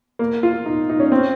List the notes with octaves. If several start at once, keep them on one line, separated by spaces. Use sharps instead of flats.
A#3
F4
D#4
D#4
C#4
C4